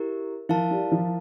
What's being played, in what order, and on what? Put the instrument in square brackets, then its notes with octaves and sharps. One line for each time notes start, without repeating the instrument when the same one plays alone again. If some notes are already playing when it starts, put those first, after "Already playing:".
Already playing: [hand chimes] E4 G4 A#4
[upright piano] F3 [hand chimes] E4 A#4 F5 A5
[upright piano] G3
F3